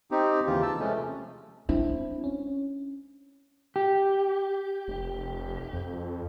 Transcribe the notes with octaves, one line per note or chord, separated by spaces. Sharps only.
C4 D#4 G4
D#2 C#3 E3 F4 G4
A5 E6
C3 F3 G#3 A3 C#4
G#3 C4 D4 E4
C#4
G4
F1
F2